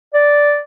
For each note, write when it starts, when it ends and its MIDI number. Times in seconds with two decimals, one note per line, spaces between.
0.14 0.59 74